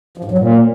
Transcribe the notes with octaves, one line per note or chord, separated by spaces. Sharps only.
F3
G#2
F#3
A#2